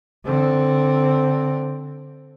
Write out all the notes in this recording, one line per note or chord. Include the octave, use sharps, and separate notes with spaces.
D3 C4